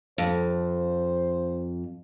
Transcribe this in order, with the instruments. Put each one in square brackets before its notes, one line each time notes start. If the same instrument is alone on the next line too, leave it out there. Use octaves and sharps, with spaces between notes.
[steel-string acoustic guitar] F2 [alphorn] C5